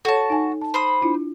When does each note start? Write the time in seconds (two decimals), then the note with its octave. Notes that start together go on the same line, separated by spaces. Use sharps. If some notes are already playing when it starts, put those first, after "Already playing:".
0.05 F#4 A4 C#5 A5
0.30 D#4 G#5
0.62 A5
0.74 C5 B5 D#6
1.01 D4 E4 F4